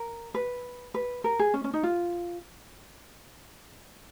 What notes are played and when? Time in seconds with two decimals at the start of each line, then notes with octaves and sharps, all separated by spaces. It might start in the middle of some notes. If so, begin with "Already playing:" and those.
Already playing: A#4
0.34 B4
0.94 B4
1.24 A#4
1.39 G#4
1.54 C#4
1.64 C#4
1.74 D#4
1.83 F4